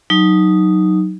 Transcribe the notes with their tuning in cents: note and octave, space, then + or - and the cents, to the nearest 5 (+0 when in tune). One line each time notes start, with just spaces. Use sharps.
F#3 +0 D#4 +0